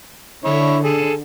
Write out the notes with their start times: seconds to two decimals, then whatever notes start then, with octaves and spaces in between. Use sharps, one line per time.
0.45 D3 E4 C#5
0.84 G#4 A4